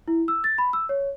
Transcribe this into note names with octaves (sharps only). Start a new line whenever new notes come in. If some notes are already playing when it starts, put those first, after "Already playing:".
E4
E6
A6
B5
E6
C#5